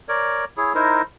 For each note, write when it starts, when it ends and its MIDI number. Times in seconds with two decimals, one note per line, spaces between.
0.09 0.45 70
0.09 0.45 73
0.09 0.45 74
0.57 0.73 64
0.57 0.73 68
0.57 0.73 73
0.75 1.02 63
0.75 1.02 64
0.75 1.02 70
0.75 1.02 72